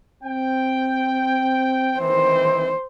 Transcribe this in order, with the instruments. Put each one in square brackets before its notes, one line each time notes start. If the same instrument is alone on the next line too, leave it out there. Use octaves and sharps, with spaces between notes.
[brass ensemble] C4 G5
[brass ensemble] D#3 E3 C4 [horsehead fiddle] C5